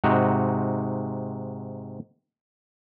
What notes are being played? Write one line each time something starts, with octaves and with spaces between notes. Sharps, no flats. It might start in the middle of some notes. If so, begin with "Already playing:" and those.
G#2 C3 D#4 F#4